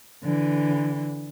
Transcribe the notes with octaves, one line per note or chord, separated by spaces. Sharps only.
D3 E3